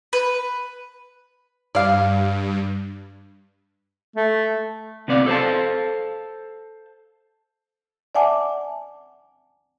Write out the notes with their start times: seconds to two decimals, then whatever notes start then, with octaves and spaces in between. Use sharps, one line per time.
0.13 B4
1.75 G2 D5 F5
4.16 A3
5.08 C3 B3 D5 F5
5.26 A4 C5 F5 A5
8.15 D5 E5 F#5 G#5 A5 D6